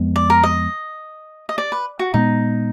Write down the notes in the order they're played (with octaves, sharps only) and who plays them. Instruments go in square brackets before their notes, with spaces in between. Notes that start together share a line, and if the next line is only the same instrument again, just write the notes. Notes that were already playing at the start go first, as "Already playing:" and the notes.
Already playing: [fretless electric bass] F2 F3 G#3 B3
[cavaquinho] D5
A#4
D#5
D#5
D5
B4
F#4
[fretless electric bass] A#2 G#3 B3 [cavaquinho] D#4